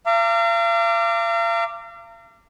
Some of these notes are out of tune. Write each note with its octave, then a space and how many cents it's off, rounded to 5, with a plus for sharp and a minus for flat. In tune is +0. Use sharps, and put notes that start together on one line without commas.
F5 -40 A#5 -35 D6 +0